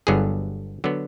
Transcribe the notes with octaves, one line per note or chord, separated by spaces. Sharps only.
G1 G2 D3 F#3 B3 G#4
D3 F#3 B3